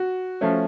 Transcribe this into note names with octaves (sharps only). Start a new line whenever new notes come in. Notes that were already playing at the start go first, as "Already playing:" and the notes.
Already playing: F#4
F3 A3 C#4